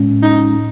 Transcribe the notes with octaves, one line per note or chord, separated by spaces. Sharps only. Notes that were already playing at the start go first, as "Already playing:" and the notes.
Already playing: A2 G#3 C#4
D#4
A2